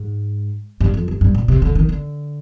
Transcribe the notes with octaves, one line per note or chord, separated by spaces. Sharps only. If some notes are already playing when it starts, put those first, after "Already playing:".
Already playing: G#2
G2
F2
G2
G2
A#2
C3
D3
D#3
D3